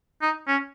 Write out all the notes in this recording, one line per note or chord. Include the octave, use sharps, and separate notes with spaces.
D#4
C#4